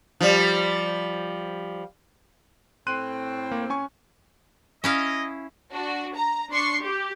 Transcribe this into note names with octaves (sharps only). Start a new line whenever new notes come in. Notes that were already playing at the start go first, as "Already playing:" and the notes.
F3 G3
A2 C4 C6 F#6 D#7
A#3
C#4 G#5 C#6
C#4 E4 D#5 F5
D4 F#4
A#5
D4 C6 C#6 C7
G4